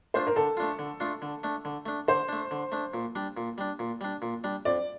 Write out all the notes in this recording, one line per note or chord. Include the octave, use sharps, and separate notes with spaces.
A3 D4 F4 C5
A#4
D3 A4
A3 D4 F4
D3
A3 D4 F4
D3
A3 D4
D3
A3 D4
D3 C5
A3 D4
D3
A3 D4
A#2
G3 D4
A#2
G3 D4
A#2
G3 D4
A#2
G3 D4
F2 D5